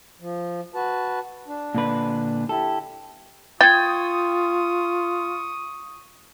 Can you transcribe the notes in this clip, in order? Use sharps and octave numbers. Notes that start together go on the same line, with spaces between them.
F3
F#4 B4 A5
D4
A#2 D3 B4
E4 G4 A4
F4 G5 C#6 D#6 G#6 A6